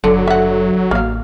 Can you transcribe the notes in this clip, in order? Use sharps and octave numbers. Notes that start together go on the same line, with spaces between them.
F#1 D3 F#3
E5 F#5
A1 A#3 F5